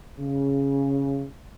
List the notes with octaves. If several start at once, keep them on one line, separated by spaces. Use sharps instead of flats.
C#3